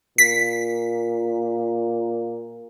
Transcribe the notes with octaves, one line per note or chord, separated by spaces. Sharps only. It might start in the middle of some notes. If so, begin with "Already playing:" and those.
A#2 B6